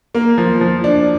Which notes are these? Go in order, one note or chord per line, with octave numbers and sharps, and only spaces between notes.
A#3
F3
F3
D4